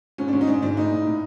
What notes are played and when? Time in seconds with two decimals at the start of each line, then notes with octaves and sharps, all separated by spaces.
0.18 G#2 C#4
0.28 D4
0.33 G#2 C#4
0.41 D#4
0.47 G#2 D4
0.62 G#2 D4
0.77 A2 D#4
0.92 A2
1.06 A2